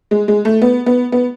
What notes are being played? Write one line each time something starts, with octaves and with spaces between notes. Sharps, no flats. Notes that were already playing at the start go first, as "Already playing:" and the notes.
G#3
G#3
A3
B3
B3
B3